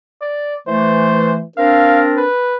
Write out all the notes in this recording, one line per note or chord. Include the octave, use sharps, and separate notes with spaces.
D5
E3 A3 C5
C4 D4 A#4 F5
B4